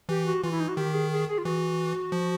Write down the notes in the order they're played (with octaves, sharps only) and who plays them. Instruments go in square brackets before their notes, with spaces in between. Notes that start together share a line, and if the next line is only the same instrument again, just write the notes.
[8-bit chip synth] E3 [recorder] G4
[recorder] F#4
[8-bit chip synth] E3 [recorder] F4
[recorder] E4
D#4
F#4
[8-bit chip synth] D#3 [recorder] G4
[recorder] G#4
G#4
G#4
F4
[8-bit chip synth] E3 [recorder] F#4
[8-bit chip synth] F3